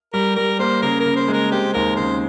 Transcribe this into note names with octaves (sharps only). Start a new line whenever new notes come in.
G3 A#4
G3 A#4
A#3 C5
C#3 A#4
A#4
C#3
C5
G#3
A#4
C4 G4
D#2 A#4
C#3 C5